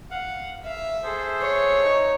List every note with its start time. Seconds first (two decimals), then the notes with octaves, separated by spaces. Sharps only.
0.11 F5 F#5
0.65 E5 F5
1.03 G#4 A4 C5
1.42 C#5
1.81 D#4